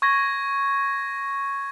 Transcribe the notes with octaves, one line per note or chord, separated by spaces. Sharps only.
C#6 G#6 A#6